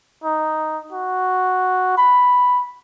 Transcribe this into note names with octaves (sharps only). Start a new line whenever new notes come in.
D#4
F#4
B5